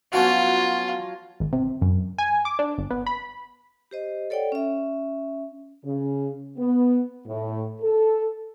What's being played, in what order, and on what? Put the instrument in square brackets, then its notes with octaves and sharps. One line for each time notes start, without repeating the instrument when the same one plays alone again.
[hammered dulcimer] F3 F#3 C#5 [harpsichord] B3 C#4 F#4 [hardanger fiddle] F4
[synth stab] G#1
C3
F#2
G#5
D6
D4
G1
B3
B5
[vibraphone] G4 C5 D#5
A4 C#5 D5 F#5 G5
C#4 E5
[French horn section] C#3
B3
A2
A4